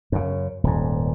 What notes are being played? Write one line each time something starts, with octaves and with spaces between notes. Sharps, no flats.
F#2 C#3
D#1 G#2